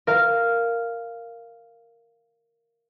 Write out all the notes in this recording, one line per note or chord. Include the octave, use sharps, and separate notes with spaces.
A#4 F5